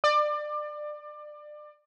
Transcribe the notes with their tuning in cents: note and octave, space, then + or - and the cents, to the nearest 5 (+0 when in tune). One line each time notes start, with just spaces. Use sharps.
D5 +25